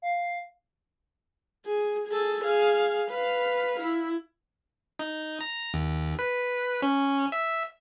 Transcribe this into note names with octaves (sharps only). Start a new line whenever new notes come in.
F5
G#4
G#4 A4
G#4 F5
B4 F5
E4
D#4
A#5
D#2
B4
C#4
E5